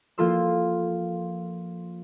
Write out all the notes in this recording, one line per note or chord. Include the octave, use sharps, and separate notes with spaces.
F3 A#3 F4 A4 C6 E6